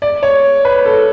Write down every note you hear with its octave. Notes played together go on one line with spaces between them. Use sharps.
D5
C#5
B4
A4